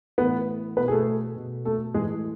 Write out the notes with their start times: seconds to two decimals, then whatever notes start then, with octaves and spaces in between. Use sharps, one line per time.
0.18 A2 E3 B3 B4
0.77 B2 B3 B4
0.88 G#4
0.91 A3 A4
1.36 B2
1.65 A3 A4
1.94 A2 E3 G#3 G#4